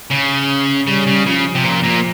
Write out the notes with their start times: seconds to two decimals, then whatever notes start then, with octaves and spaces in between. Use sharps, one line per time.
0.10 C#3
0.87 C#3 G3
1.07 C#3
1.26 C#3 F3
1.55 C3
1.64 A#2
1.84 A#2